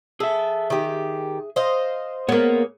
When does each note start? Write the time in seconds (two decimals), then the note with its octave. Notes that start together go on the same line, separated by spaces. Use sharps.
0.20 G#4 A4 E5
0.70 D#3 G4
1.56 C5 D#5 F5
2.29 A#3 B3 G#4 C#5